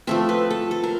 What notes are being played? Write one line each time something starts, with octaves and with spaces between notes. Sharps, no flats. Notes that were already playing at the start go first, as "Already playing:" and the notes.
F3 A3 C4 E5
B4
A4
A4
A#4